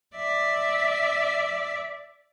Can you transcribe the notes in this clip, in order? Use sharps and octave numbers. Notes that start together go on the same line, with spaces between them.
D5 E5